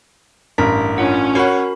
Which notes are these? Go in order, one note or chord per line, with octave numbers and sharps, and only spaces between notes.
A1 G2 A#4 B6
C#4 D4 F4 F#5
F#4 A#4 C#5 F#5 B5